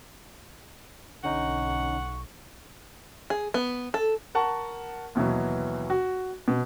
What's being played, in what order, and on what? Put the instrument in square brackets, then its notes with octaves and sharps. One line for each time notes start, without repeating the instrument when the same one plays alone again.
[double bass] B1 [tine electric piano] D3 C#4 D#4 [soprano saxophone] F#5 [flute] C#6
[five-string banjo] G#4
B3
A4
[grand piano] A#4 F#5 A5 C#6
D#2 B2 E3 F#3
F#4
B2